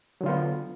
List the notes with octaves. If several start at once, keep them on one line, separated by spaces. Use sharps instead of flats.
D3 F#3 B3 F4